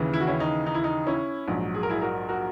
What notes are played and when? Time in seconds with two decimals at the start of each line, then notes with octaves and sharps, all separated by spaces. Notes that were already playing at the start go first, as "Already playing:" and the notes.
Already playing: D#2 C#3 E3
0.13 E4
0.20 F#4
0.27 C#4 E4
0.40 D#4
0.66 D#4
0.75 E4
0.84 D#4
1.07 C#4 E4
1.48 A#1 G#2 F#3
1.74 G#4
1.83 A#4
1.90 E4 G#4
2.02 F#4 A#4
2.29 F#4 A#4